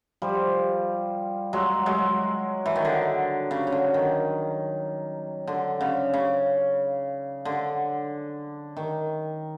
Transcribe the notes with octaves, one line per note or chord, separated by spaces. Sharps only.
F3 G3
F#3 G#3
F#3 G#3
E3
D#3
D3
C#3
C#3
D3
D#3
D3
C#3
C#3
D3
D#3